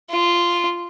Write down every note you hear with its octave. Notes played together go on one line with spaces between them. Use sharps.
F4